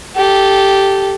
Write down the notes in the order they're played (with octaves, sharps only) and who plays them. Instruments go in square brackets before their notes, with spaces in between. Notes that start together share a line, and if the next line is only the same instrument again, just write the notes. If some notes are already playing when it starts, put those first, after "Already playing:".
[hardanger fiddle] G4 A4